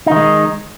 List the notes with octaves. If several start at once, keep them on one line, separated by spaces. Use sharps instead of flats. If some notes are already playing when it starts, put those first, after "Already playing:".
D#3 G#3 D#4